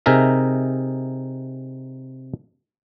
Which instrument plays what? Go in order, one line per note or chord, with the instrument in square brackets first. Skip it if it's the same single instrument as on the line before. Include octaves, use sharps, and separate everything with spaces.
[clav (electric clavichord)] C3 D#4 G#4 A#4 E5